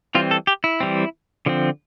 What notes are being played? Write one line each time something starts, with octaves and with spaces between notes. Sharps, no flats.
E3 G3 C4 F4
A4
G4
E4
E3 G3 C4
D3 F3 C4